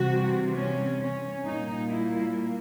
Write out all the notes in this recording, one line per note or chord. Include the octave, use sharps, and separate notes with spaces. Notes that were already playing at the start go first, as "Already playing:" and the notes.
Already playing: C3 E3 G3 C4 F#4
C#4
C#4
A#2 G3 A#3 D#4
E4